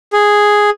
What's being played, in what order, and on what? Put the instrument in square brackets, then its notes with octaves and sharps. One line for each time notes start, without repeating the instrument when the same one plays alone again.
[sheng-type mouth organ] G#4